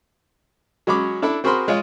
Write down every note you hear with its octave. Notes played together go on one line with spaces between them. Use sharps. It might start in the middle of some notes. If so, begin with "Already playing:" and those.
F#3 G#3 C#4 B5 D6
D4 E4 A4 B5
C4 F#4 G#4 A#4 B5 C6
G#3 F4 C#5 D#5